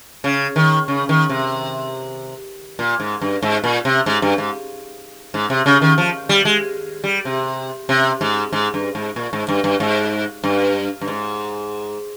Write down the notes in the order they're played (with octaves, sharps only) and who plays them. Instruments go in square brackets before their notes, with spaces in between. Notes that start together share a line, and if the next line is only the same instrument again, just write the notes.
[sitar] C#3
D#3
C#3
D#3
C3
A#2
G#2
G2
G#2
A#2
C3
G#2
G2
G#2
G#2
C3
C#3
D#3
F3
G3
G#3
G3
C3
C3
G#2
G#2
G2
G#2
A#2
G#2
G2
G2
G#2
G2
G2
G#2